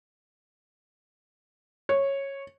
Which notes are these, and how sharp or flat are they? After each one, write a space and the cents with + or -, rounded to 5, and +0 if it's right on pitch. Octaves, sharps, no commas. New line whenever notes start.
C#5 -10